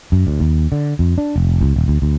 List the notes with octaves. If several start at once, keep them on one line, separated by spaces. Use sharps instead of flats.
F#2
D2
D#2
D3
F2
D4
F1
C#2
D#1
D2
D2